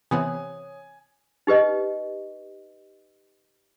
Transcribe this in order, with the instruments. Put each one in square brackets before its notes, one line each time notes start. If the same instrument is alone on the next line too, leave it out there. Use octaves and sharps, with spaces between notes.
[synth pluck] C3 E3 B3 [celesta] C#5 D#6 [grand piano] G#5
[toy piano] D#4 G4 B4 D#5